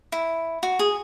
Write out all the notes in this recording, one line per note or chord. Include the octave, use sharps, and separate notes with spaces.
E4
F#4
G#4